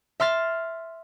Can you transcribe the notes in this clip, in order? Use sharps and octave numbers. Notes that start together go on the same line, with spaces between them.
E5 C6 F6 A6